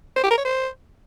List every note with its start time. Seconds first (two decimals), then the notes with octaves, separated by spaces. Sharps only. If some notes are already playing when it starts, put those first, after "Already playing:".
0.16 C5
0.23 G4
0.31 A#4
0.38 C#5
0.45 C5